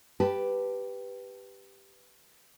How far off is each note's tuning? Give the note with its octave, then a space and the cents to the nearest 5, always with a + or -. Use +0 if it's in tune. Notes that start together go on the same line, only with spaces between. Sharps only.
G4 +0 B4 +0 A5 +0